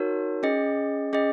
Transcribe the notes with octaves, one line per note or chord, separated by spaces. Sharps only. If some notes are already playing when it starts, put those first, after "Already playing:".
Already playing: D#4 F#4 A#4 C#5
C#4 G#4 D#5
C#4 G#4 D#5